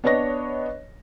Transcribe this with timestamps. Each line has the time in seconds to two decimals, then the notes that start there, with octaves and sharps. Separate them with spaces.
0.04 B3 D4 C#5 D#5 A#6